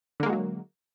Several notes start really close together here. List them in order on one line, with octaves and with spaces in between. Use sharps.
D3 A#3 G#3 F#4 F#3